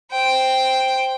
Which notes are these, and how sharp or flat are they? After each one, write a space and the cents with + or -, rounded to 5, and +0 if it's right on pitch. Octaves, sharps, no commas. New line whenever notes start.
C5 +0 G5 +0